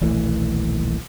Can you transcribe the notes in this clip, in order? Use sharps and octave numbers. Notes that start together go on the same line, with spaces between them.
D#1 B1 E3 A3